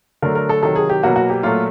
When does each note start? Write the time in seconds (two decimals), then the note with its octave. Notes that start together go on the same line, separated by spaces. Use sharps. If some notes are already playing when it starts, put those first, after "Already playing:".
0.22 D3 F#3 A3 A#4
0.35 A#4
0.49 A4
0.63 C3 D#3 F#3 A4
0.76 G#4
0.89 G4
1.03 B2 F#3 A#3 F#4
1.16 F#4
1.30 G4
1.43 A#2 F#3 A3 F4